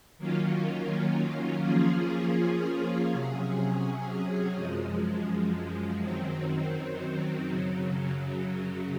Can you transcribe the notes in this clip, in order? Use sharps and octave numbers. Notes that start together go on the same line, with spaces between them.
D#3 F#3 A#3 C#4 F4
F3 A#3 C#4 F4 G#4
C3 F#3 C#4 G#4
F#2 F3 G#3
F#2 D#3 F#3 C4
F#2 C#3 F#3